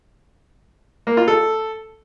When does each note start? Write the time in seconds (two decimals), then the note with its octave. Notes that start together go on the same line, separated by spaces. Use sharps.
1.07 A#3
1.17 F4
1.28 A4